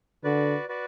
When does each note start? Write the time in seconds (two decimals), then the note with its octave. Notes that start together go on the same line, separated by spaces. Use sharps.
0.24 D3 F#4 B4 D5
0.69 F#4 B4 D5